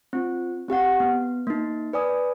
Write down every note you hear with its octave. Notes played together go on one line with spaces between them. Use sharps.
C4 F4
C4 G4 F5 F#5
B3
A#3 D#4
B4 D5 G#5 D#6